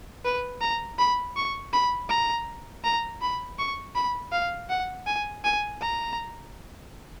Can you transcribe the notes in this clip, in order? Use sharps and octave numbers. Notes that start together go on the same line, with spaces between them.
B4
A#5
B5
C#6
B5
A#5
A#5
B5
C#6
B5
F5
F#5
G#5
G#5
A#5